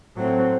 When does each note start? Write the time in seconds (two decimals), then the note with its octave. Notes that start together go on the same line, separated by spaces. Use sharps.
0.16 A2 F#3 C4 C5